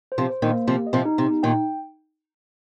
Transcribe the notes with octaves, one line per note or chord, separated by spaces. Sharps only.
C5
C3 F3
C5
A#2 D#3
A#3
C3 F3 G4
D#5
C3 F3
D#4
C3
D#4
A#2 D#3 G5